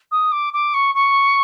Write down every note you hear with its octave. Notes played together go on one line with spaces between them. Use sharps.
D#6
D6
D6
C#6
C#6